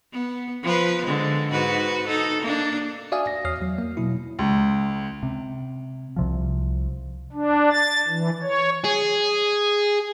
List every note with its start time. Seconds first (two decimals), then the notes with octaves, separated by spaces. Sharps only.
0.12 B3
0.63 F3 B4
1.05 D3 G#3
1.51 G#2 F#4 B4
2.07 D#4 A4
2.42 A#3 D4
3.12 F#4 D5 E5 F5 G#5 D#6
3.27 A#6
3.45 E2 C#5 D#6 F6 C7
3.61 E2 F#3
3.78 A#3
3.97 B2 F#3 E4
4.39 C#2
5.23 C3
6.16 C2 C3 F3
7.33 D4
7.71 A6
8.08 E3
8.42 C#5
8.84 G#4